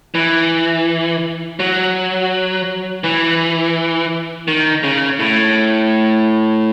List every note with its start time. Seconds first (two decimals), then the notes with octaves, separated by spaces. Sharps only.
0.15 E3
1.60 F#3
3.04 E3
4.48 D#3
4.83 C#3
5.20 A2